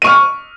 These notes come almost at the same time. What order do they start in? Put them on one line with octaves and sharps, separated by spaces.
D#7 C#6 F6